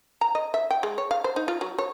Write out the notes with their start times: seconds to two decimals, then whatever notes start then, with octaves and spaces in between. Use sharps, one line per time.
0.21 A#5
0.35 D#5
0.54 E5
0.70 G5
0.83 G#3
0.98 C#5
1.11 F5
1.24 C5
1.36 D#4
1.48 F4
1.61 F#3
1.78 C#5